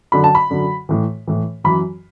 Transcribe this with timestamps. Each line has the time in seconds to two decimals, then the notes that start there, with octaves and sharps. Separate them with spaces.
0.12 F#2 D3 B5
0.24 A5
0.35 B5
0.50 F#2 D3
0.89 A2 E3
1.28 A2 E3
1.64 F#2 E3 B5